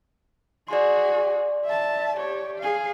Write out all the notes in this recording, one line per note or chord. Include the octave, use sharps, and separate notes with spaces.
F#4 G#4 D5 C6
E5 A5
G4 C#5
G#4 F5